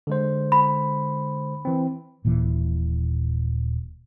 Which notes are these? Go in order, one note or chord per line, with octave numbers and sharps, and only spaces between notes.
D3 G#3 C5
B5
E3 C4
D#1 A#2 E3